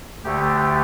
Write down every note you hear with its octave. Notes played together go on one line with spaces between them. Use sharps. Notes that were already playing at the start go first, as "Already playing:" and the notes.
D2 D3 A3 G4